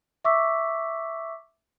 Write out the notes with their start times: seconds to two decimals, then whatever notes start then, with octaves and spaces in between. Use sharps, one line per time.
0.25 E5 C#6 D6 E6 B6